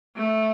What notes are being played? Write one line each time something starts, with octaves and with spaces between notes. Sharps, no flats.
A3